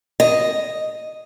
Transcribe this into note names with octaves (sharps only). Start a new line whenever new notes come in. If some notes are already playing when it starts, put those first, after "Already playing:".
D#5